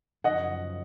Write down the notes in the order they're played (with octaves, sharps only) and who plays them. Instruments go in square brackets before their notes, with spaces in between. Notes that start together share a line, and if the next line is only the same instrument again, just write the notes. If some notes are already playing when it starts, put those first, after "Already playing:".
[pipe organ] F#2 C#3 F3 [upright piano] D#5 F#5